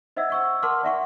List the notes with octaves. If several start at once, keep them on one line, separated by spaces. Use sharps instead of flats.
C5 D#5 E5 F#5 E6 G#6
F#5 C#6 E6
A#4 F#5 A5 C6 D6 F6
D5 E5 F#5 C#6